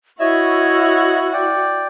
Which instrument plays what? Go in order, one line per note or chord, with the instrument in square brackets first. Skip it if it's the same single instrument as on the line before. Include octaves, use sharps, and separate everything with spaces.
[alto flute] E4 [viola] F#4 [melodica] C#5 D#5 [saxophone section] E5
[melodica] D5 G5